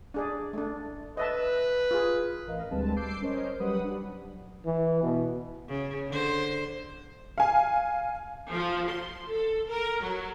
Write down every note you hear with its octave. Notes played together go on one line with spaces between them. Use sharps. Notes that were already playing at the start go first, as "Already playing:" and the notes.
D4 G#4 D5
A3 D4
B4 D#5 E5 A5
F4 G#4
A1 A#4 D#5 F5
D2 G3 G#3 C4 B4 A5
D6 E6 G6 C7 D7
C#4 A#4 C5 C#5 D#5
F#3 G3 B4 F#5 B5 D#6
D4
E3
B2
C#3
D3 C5
F5 G#5
F3
C6
A4
A#4
F#3